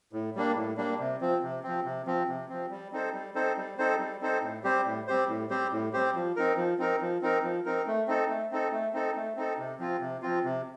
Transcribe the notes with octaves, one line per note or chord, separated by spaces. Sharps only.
A2
G3 A#3 D4
A2
G3 A#3 D4
C3
F3 C4
C3
F3 C4
C3
F3 C4
C3
F3 C4
G3
C4 D#4 A4 C5
G3
C4 D#4 A4 C5
G3
C4 D#4 A4 C5
G3
C4 D#4 A4 C5
A2
G3 C4 G4 C5
A2
G3 C4 G4 C5
A2
G3 C4 G4 C5
A2
G3 C4 G4 C5
F3
C4 D#4 A#4
F3
C4 D#4 A#4
F3
C4 D#4 A#4
F3
C4 D#4 A#4
A3
C4 D#4 A4
A3
C4 D#4 A4
A3
C4 D#4 A4
A3
C4 D#4 A4
C3
F3 C4 F4
C3
F3 C4 F4
C3